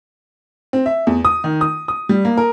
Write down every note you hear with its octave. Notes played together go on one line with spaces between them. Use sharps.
C4
E5
E2
D#6
D#3
D#6
D#6
G3
A#3
A#4